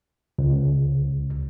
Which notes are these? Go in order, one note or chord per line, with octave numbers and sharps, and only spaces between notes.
C#2